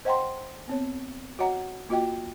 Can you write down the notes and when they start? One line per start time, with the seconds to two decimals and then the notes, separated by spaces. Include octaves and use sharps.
0.05 C5 D#5 F#5 G5 A#5 C6
0.67 B3 C4 C#5
1.39 F#4 C#5 D#5 F#5 A#5
1.89 A#3 F4 F#4 D#5 G5